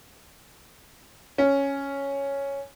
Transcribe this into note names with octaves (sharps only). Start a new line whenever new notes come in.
C#4